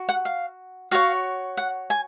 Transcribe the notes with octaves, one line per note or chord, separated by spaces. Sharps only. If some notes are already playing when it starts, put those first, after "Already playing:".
Already playing: F#4
F#5
F5
F#4 C#5 F5
F#5
G#5